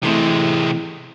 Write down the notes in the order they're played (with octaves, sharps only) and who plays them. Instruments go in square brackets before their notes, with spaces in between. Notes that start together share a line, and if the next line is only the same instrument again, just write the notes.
[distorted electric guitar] C3 G#3 [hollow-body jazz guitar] E3 A3 C4